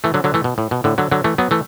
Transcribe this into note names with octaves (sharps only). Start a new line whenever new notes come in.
E3 A3
D3 F#3
D3 F#3
E3 A3
B2
A2
B2
A2 D3
D3 F#3
D3 F#3
E3 A3
F#3 B3
E3 A3